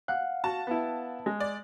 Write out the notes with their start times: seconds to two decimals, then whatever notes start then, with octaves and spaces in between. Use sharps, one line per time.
0.08 F5 F#5 F#6
0.44 F#4 A5
0.67 B3 E4
1.26 G#3
1.40 D5